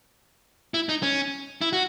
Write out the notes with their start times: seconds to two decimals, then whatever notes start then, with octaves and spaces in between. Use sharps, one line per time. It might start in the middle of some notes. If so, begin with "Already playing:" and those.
0.74 E4
0.89 D#4
1.03 C#4
1.61 E4
1.73 F#4